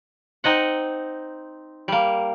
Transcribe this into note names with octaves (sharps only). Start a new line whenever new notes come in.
C4 D#4 D#5 F#5
G3 A#3